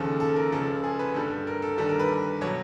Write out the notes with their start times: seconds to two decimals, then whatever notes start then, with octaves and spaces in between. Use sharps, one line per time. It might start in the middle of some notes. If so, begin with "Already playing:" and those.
Already playing: D#2 C#3 F3 A4
0.20 A4
0.36 A#4
0.52 C#2 C#3 F3 A4
0.84 G#4
0.99 B4
1.14 G2 D3 G3 A4
1.30 A4
1.47 A#4
1.62 A4
1.78 D#2 D3 G3 A4
1.89 A#4
1.99 B4
2.41 B2 F#3 C#5